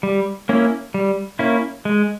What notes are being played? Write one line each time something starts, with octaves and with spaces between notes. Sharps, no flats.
G3
A#3 C#4 E4
G3
A#3 C#4 E4
G#3